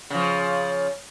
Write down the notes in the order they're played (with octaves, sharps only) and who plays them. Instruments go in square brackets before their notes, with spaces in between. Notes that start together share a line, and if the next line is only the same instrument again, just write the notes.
[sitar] C#3 F3